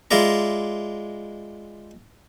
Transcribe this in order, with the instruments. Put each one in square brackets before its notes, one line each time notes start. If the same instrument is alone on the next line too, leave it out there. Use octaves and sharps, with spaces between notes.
[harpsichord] G#3 E4 F4 D5 A#5